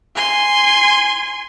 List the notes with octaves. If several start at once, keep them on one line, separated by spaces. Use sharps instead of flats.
G#5 C6